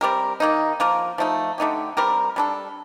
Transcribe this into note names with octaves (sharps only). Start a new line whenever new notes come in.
G3 C4 G4 A#4
D#3 A#3 D#4
F3 A#3 F4 A#4
F3 A3 D#4
D3 A3 D#4 G4
G3 C4 G4 A#4
G3 D4 A4